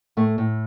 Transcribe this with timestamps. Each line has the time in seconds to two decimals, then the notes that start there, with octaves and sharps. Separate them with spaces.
0.17 A2 A3
0.38 A2